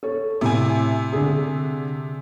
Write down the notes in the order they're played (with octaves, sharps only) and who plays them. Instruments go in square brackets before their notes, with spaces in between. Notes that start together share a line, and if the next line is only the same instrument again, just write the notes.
[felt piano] A4 C#5
[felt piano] A2 [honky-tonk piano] C3 G#5
[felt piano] D3 G#4